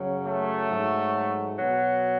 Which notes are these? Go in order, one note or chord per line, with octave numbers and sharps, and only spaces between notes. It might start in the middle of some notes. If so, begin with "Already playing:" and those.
Already playing: F#2 C#3 F#3
A3
G#2 F#3
B2 F#3